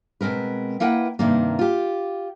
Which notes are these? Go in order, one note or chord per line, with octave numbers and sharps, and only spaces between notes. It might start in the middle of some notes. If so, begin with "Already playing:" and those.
B2 G#3 C4 A#4 B4
A#3 E4 A#4 B4 F#5 G5
G2 C3 D#3 A#3
F4 G4